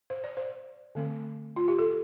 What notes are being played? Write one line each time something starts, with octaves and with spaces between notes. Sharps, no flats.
C5
D5
C5
D3 A3 C4
F4
G4
A4